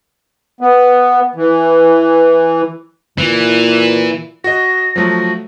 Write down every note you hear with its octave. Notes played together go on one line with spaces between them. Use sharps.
B3
E3
A#2 E3
F#4 D#5 A#6
F3 F#3 A3 A#6